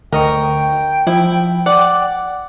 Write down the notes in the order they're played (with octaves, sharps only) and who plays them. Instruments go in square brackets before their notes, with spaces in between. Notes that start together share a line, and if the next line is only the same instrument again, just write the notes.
[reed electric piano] D2 D#5 C#6 [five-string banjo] A#4 [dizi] G5
[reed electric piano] F3 [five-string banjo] E4
[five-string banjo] D5 [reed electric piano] F#5